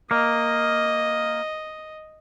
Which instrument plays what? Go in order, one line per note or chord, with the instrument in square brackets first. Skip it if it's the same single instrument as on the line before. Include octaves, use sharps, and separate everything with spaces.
[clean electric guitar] A#3 [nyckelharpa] D#5